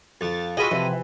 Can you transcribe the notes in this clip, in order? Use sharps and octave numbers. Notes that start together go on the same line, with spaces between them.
F2 A6
F4 F#4 G#4 A4 B4 D#5
C3 E3 F3